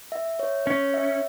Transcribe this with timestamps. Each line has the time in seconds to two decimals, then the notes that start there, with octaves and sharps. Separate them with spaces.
0.12 E5
0.39 C#5
0.66 C#4 C#5
0.94 E5